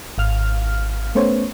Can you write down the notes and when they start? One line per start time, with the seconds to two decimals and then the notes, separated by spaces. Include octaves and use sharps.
0.18 G#1 F5 F6
1.15 A3 B3 C#4 C5 C#5